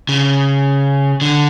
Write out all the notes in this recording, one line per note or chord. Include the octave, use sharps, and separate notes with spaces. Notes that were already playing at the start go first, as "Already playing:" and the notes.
C#3
D3